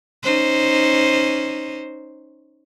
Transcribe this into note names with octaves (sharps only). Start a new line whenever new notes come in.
C#4 D#4 C5